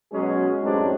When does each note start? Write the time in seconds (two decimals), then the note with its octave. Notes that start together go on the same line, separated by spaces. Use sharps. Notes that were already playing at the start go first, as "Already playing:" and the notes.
0.12 B2 F#3 G#3 C#4 G#4
0.62 A1 F#2 G#3 C4 D4 D#4